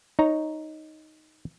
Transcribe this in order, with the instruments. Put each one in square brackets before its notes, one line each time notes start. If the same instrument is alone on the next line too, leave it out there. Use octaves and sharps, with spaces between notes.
[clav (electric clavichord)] D#4 C#5 A#5